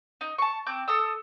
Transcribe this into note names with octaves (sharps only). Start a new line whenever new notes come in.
D#4
A5 C#6
C4 D6 G6
A4 D#6 E6